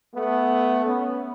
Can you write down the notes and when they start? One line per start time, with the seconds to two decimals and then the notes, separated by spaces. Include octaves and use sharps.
0.14 A3 B3
0.85 B3 C#4